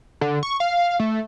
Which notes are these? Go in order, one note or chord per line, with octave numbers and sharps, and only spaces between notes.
D3
C#6
F5
A3